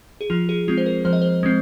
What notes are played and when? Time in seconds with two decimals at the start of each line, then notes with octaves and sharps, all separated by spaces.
0.21 G#4
0.30 F3 F4
0.49 G#4
0.68 G#3 C4 F4
0.78 C5
0.86 A#4
1.05 F3 C5
1.13 D#5
1.22 C5
1.43 G#3 C4